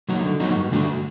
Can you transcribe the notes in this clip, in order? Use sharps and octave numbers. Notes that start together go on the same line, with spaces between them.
F#3 A#3 D#4 F#4
D3
F#3 A#3 D#4 F#4
G2
D3 A3 D4 F#4